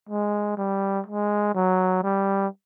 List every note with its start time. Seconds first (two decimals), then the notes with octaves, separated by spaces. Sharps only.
0.09 G#3
0.57 G3
1.07 G#3
1.55 F#3
2.03 G3